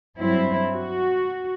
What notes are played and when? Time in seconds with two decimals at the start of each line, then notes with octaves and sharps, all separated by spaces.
0.19 G2 F#3 C4 E4
0.73 F#4